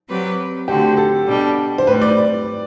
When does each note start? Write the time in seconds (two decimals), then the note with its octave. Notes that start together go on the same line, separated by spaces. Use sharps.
0.08 F#3 C4 G4 B4 D5
0.68 D3 A3 C4 F#4 G4 A4
0.97 A4
1.27 B2 G3 D4
1.78 C5
1.87 A2 G3 C4 B4
2.02 D5